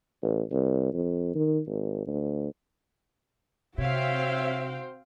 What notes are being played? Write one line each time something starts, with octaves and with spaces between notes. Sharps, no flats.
A1
C2
F2
D#3
G#1
D2
C3 C4 F#4 C5 C#5 E5 F5 G5